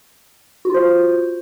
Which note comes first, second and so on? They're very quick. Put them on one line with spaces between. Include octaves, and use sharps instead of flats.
F#4 F4 C5